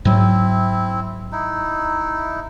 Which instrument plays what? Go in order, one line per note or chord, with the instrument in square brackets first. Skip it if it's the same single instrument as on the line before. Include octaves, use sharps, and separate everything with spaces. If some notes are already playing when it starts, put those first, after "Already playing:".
[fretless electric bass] G#2 F#3 [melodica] C4 E4
[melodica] D#4 E4